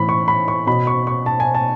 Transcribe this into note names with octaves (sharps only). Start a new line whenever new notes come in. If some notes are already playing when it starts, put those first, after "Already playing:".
Already playing: A2 E3 B5
C#6
B5
C#6
B2 B5
C#6
C#6
A5
G#5
A5